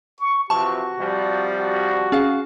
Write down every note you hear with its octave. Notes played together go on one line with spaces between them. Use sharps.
C#6
C3 E3 F3 F#4 A5 C#6
C3 F3 G3
F#4
C#4 G#4 F5